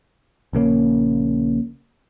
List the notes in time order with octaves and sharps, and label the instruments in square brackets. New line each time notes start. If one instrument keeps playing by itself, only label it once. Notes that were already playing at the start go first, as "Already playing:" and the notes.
[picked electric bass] A#1 C#3 A#3 C#4